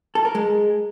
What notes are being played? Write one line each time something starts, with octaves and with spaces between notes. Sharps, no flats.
A4
A#4
G#3